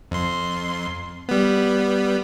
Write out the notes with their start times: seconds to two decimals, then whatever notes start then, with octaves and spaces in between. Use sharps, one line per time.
0.11 F2 C6
1.29 G3 B3